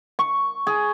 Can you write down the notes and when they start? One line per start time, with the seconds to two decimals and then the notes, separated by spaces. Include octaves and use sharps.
0.19 C#6
0.67 G#4